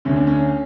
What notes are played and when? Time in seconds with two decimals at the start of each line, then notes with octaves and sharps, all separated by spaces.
0.05 D2 D3 C#4
0.16 D4
0.27 C#4